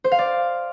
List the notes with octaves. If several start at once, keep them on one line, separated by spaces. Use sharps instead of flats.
C5
F5
D5